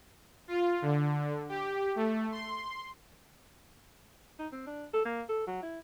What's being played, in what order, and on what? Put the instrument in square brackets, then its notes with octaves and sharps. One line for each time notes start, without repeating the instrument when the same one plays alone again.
[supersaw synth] F4
D3
G4
A3
C6
[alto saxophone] D#4
C4
D4
A4
A#3
A4
F#3
E4